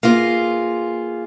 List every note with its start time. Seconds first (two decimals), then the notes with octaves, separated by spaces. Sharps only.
0.03 A#3 B3 F4 G#4